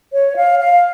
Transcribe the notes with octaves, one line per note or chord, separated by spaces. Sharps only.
C#5
F5
F5